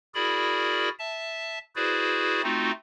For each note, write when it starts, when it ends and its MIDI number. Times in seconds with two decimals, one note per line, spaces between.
0.15 0.89 64
0.15 0.89 66
0.15 0.89 68
0.15 0.89 70
0.15 0.89 74
0.15 0.89 83
0.99 1.59 76
0.99 1.59 81
1.76 2.42 64
1.76 2.42 66
1.76 2.42 68
1.76 2.42 71
1.76 2.42 72
1.76 2.42 74
2.43 2.71 57
2.43 2.71 60
2.43 2.71 63
2.43 2.71 65
2.43 2.71 66